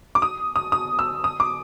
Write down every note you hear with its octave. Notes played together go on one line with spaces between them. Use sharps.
D6
D#6
D#6
D#6
E6
D#6
D6